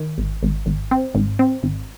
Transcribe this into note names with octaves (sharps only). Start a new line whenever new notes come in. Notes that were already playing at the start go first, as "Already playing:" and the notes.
Already playing: D#3
G#1
G#1
G#1
C4
G#1
C4
G#1